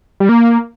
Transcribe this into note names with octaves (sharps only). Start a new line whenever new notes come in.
G3
A#3